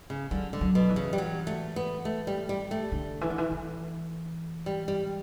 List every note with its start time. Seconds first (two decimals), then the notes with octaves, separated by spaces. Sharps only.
0.10 C#3
0.31 D3 G3
0.53 D3
0.61 F#3
0.75 B2
0.89 E3
0.96 C#3
1.13 G3
1.18 F#3
1.47 A3
1.76 B3
2.05 A3
2.27 G3
2.49 G3
2.71 A3
2.92 D3
3.21 E3
3.30 D3
3.38 E3
3.51 E3
4.66 G3
4.88 G3